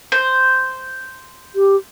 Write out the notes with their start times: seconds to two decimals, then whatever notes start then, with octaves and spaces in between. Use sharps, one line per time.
0.12 C5
1.55 G4